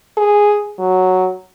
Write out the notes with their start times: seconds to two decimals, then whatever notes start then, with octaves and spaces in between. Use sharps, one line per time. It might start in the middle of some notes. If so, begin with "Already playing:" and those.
0.17 G#4
0.79 F#3